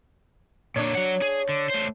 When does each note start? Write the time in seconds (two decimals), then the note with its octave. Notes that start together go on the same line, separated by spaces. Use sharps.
0.76 A#2 D3 D4 C#5
0.95 F#3 F#5
1.22 G#4
1.49 D3
1.70 A3 C5